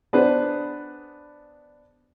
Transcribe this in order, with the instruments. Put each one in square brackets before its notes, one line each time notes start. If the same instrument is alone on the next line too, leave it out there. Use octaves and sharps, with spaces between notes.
[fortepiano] B3 D4 G#4 B4 C5